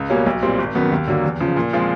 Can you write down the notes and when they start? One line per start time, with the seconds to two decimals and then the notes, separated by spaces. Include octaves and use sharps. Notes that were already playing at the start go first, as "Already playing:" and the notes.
Already playing: C#2
0.10 B2 G3 A#3 C#4
0.26 B1
0.42 A#2 G3 C4
0.59 G#1
0.75 F#2 D#3 F#3 B3
0.92 D#2
1.07 D3 F#3 A#3
1.24 E2
1.40 C#3 F3
1.56 A#2
1.73 F3 G#3 C4 F4